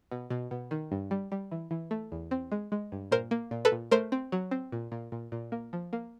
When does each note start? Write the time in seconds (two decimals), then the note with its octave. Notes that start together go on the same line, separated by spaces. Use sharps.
0.12 B2
0.30 B2
0.51 B2
0.71 D#3
0.92 G2
1.11 G3
1.32 G3
1.51 E3
1.71 E3
1.91 A3
2.12 E2
2.31 C4
2.52 G#3
2.72 G#3
2.92 G2
3.11 A#2 A#4 C5
3.31 A#3
3.51 A#2
3.65 A4 B4
3.72 A#2
3.91 A3 A#4 C5
4.12 C4
4.32 F#3
4.51 C4
4.72 A#2
4.92 A#2
5.12 A#2
5.32 A#2
5.52 A#3
5.73 F3
5.93 A#3